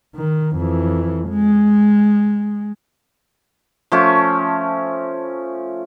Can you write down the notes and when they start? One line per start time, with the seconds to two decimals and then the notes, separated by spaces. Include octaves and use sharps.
0.16 D#3
0.56 F2 E3
1.29 G#3
3.92 F3 A3 C#4